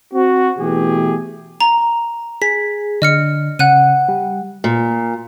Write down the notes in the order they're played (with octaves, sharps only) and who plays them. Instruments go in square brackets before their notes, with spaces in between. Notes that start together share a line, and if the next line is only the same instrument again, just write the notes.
[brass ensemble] C4 F#4
B2 E3 A3 G4 G#4
[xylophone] A#5
[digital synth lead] G#4 [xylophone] B6
[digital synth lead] D3 [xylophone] D#5 F6 C#7
[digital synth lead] C#3 [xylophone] F#5 F#6 D#7
[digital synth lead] G3
[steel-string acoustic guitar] A#2